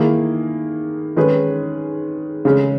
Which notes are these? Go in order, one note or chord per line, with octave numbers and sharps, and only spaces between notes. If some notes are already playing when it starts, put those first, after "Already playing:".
Already playing: D#3 A#3 E4 G#4
D#3 G#3 C#4 G#4 B4
C#3 G#3 C#4